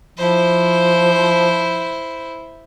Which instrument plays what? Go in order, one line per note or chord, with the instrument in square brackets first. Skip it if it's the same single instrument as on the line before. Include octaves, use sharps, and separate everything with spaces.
[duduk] F3 [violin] E4 C5